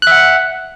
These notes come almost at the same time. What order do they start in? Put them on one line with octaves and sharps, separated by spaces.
F#6 E5 F#5